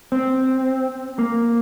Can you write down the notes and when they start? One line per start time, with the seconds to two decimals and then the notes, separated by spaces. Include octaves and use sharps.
0.12 C4
1.19 A#3